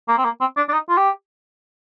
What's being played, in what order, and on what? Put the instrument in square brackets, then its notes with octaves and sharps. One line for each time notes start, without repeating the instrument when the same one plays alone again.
[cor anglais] A#3
C4
A#3
C4
D4
D4
D#4
F4
G4